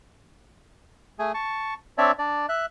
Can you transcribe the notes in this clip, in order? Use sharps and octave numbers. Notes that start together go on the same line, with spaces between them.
A3 G#4 G#5
A5 C#6
C4 D4 C#5 D5 E5
D4 D5
E5 F#6